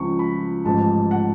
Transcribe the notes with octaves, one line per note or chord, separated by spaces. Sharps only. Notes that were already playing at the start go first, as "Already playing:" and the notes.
Already playing: C#2 C#3 F3 C#6
B5
A1 G#2 F3 A5
F#5